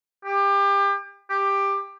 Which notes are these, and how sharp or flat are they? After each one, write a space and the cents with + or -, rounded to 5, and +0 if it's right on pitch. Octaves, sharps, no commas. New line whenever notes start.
G4 +25
G4 +15